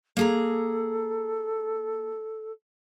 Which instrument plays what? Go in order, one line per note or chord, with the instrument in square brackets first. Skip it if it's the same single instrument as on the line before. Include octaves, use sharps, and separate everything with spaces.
[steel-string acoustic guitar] A#3 G#4 A#5 [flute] A4